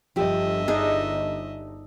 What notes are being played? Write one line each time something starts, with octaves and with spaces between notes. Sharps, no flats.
G1 F3 G4 D#5 E5
D4 D#4 G#4